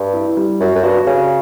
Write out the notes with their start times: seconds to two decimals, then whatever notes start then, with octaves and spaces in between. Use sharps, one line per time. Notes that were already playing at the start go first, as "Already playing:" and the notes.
Already playing: G2
0.14 E4
0.37 G3
0.60 F#2 F#4
0.75 F#2
0.83 G2 F#4
1.07 C#3 F#4